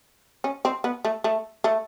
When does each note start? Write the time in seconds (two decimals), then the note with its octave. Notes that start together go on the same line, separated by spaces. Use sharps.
0.44 C#4
0.65 C4
0.84 B3
1.05 A3
1.24 A3
1.64 A3